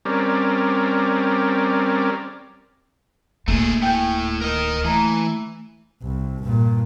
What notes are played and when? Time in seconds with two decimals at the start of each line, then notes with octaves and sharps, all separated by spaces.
0.05 G3 C4 C#4 A#4 D5
3.48 D1 A3 A#3 D4 G#4
3.82 A2 A3 G5 G#5 G6
4.41 A#4 D#5
4.85 E3 A3 A#5
6.02 C2
6.44 G2 A#2